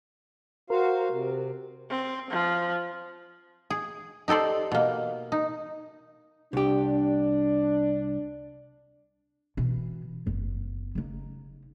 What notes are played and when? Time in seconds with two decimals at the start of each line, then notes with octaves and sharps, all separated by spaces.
0.70 F#4 A#4 C5 F5
1.10 C3
1.89 C4
2.30 F3
3.70 G#4
4.28 D#4 G4 A4 C5 D5
4.72 B2 A#3
5.32 D#4
6.53 C2 D4 G4
9.57 B2 E3
10.26 F#1 B3
10.95 C#3 D#4